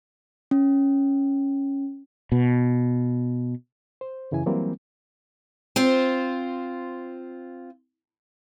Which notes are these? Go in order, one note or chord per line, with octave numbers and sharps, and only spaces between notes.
C#4
B2
C5
F#2 C#3 E3 E4 G#5
E3 F#3 G3 A#3 C4
C4 F4 C5